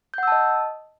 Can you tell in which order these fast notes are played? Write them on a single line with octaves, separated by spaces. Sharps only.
G6 F#5 E6 A5 D#5